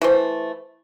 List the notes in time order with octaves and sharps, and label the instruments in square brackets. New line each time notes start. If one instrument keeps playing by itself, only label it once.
[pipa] E3 A3 C5